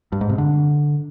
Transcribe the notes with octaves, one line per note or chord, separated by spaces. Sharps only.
G2
G#2
C3
D3